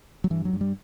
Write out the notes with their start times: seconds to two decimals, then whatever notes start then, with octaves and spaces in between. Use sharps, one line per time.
0.24 F#3
0.30 G2 E3
0.45 F#3
0.53 G2
0.61 G3